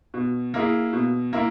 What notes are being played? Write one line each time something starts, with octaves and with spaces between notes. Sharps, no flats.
B2
A#3 E4 G#4
B2
A#3 E4